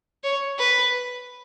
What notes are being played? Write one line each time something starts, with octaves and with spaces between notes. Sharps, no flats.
C#5
B4